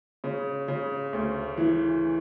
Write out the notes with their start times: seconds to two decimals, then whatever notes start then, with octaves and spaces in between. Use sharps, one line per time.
0.24 C#3
0.68 C#3
1.13 D2
1.58 E3